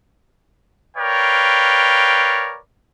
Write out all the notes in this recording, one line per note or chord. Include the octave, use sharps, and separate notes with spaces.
A#4 B4 C#5 D5 F5 G5